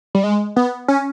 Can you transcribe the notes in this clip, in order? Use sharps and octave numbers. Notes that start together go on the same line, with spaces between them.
G3
G#3
B3
C#4